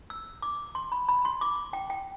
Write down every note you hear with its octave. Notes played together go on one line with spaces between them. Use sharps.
E6
D6
C6
B5
B5
C6
D6
G5
G5